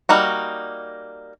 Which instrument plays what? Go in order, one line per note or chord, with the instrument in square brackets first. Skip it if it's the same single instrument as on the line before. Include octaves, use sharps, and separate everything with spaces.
[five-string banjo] G3 A#3 D#4 F#4